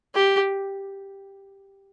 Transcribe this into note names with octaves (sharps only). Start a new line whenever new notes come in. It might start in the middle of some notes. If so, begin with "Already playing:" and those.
G4